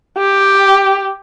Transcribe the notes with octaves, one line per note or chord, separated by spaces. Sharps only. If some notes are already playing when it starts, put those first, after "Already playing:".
G4